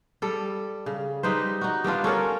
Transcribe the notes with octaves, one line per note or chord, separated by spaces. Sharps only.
G3 A4
C#3
G3 D#4 B4 C5
D#4 F#4
G3 B3 D4 F4
C#4 A4 A#4 C#5